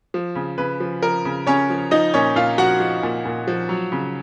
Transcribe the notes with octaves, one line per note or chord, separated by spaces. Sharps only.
F3
C#3
C#3 B4
F3
F3 A#4
C#3
C#3 C#4 C#5
F3
F3 D#4 D#5
A#2 C#4 C#5
A#2 F4 F5
F3 F#4 F#5
F3
A#2
A#2
F3
F#3
C#3